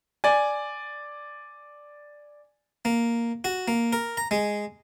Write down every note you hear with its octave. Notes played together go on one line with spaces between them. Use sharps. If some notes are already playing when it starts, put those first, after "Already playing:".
D5 G#5
A#3
F#4
A#3
A#4
A#5
G#3